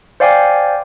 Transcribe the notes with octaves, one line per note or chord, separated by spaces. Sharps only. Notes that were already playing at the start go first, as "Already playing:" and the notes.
C5 D5 F5 G5 G#5 D6